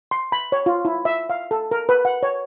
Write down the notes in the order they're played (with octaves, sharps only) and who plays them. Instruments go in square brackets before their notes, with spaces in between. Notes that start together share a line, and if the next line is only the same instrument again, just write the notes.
[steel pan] C6
B5
C#5
F4
E4
E5
F5
A4
A#4
B4
F#5
C#5